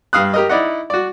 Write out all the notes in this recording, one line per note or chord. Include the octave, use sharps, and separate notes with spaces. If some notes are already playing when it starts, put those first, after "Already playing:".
G2 F5 D#6 F#6
G4 A#4 D#5
D#4 E4 D5 D#5 F#5
F#4 D5